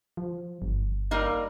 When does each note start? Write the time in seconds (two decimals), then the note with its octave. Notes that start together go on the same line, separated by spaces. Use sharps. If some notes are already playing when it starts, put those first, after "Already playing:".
0.17 F3
0.62 G1
1.11 G3 A#3 D#4